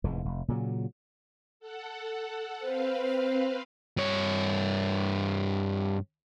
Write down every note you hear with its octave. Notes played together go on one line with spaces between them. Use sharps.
F1 E2 G#2
F1
A#2 C#3 F#3
A4 F#5
C4 B4 C5 F5
G2 C#5